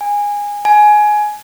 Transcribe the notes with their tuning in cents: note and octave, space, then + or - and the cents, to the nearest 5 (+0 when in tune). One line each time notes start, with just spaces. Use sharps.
G#5 -15
G#5 +15